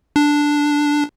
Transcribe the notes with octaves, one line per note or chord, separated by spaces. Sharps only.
D4